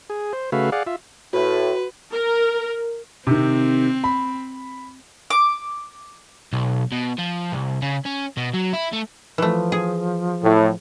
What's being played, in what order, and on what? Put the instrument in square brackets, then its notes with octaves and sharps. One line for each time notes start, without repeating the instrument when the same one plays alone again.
[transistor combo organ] G#4
C5
C#3 A3 F#4 B4 E5 F5
G#4 D5 F5 F#5
F4 E5
[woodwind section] A2 [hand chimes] F#4 [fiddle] B4
[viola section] A#4
[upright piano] C3 D#3 [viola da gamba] C4
[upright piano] B5
[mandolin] D6
[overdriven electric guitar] B1
B2
F3
C2
C#3
C#4
B2
F#3
E4
A3
[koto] E3 A3 [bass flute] F3
[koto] G#4
[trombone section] A2